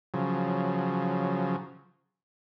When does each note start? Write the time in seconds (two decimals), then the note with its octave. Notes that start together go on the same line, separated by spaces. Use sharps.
0.14 C#3 F3 F#3